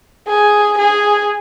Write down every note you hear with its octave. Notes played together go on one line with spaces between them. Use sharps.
G#4
G#4